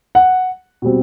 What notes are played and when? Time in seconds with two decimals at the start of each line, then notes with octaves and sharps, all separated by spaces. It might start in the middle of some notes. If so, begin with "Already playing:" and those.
0.15 F#5
0.82 B2 G3 C4